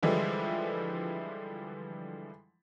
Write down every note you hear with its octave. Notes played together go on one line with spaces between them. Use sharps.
D3 E3 F3 G3 G#3 E4